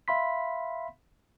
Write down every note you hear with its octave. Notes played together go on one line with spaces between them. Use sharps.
E5 F5 B5 C6 B6